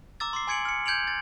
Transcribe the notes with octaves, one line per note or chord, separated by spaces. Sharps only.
A#5 D6 E6 A6
C6 D6 C7
G#5 C6 G#6 C#7 D7 F#7
F6 C#7
G6 G#6 D7 F7 F#7
A6